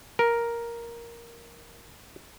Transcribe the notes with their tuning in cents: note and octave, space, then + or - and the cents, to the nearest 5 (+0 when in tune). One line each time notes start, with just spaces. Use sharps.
A#4 +5